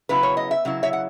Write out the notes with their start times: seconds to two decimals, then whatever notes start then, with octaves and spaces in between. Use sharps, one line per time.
0.09 C#3 F#3 B3 E4 B4
0.23 C#5
0.37 D#5
0.51 E5
0.65 C#3 F#3 E4
0.83 C#5 E5
0.93 F#5